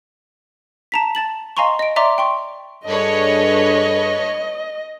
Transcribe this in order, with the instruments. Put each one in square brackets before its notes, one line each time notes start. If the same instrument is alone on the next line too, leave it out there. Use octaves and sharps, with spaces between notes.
[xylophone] A5 A#5 B6
A5 A6 F#7
D#5 F5 G#5 A#5 C6 C#6
D#5 D7
D5 E5 A#5 C6 D6
G5 C6 C#6
[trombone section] G2 G#4 A4 [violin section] D4 B4 C#5 [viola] D#5